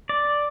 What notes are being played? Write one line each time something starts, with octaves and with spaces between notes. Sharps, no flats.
D5